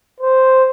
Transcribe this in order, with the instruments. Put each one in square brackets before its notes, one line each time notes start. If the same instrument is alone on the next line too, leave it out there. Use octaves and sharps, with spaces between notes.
[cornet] C5